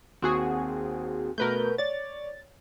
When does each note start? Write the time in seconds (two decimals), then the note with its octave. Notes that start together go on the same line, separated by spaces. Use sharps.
0.22 D#2 C4 F#4 G#4
1.38 B2 A3 A#4 B4 G6
1.78 C#5 D5 A6